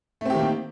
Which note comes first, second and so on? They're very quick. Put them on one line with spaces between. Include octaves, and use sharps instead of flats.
A3 C4 G4 D#3 A#3